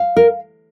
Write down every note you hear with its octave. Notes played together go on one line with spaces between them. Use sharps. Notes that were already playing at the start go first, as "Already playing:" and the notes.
Already playing: F5
A#4